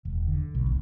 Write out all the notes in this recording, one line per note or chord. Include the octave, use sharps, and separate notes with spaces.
E1
D3
B1
D1